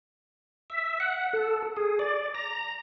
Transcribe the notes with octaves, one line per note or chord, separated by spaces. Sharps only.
E5
F#5
A4
G#4
D5
A#5